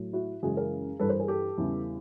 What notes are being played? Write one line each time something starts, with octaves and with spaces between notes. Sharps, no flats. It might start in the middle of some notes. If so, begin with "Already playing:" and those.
Already playing: A2 F#3
E4 F#4
F#2 C#3 E3 G#3 F#4 G#4
G#4 A#4
G2 E3 G3 A4 B4
A#4 C5
G#4 A#4
G4 A4
E2 C#3 E3 G3